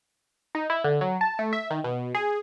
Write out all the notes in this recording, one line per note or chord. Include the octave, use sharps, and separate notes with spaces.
D#4
E4
D3
F#3
A5
A3
E5
D#3
B2
G#4